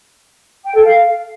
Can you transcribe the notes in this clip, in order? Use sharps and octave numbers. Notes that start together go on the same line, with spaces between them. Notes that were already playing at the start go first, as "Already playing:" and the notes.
G5
A4
F5